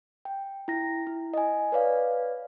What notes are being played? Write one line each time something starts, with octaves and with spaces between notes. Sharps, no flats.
G5
E4 G5 A#6
E4
D#5 G#5
B4 C#5 D5 F5